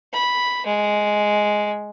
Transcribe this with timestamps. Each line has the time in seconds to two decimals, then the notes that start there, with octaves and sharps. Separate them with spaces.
0.13 B5
0.66 G#3